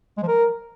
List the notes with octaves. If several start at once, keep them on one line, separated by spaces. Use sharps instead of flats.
G#3
F3
A#4